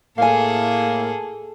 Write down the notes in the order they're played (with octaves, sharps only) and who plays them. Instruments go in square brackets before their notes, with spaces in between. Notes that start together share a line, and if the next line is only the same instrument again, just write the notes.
[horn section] A2 A#3 [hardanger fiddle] G#4 A4 [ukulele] F5 G#5